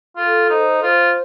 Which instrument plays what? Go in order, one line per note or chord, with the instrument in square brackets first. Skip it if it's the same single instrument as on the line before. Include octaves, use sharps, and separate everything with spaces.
[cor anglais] F4 [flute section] A4
[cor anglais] D#4 [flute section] C5
[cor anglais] F4 [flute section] C5